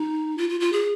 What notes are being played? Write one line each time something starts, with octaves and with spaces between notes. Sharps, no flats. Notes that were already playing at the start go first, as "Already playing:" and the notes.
Already playing: D#4
F4
F4
F4
G#4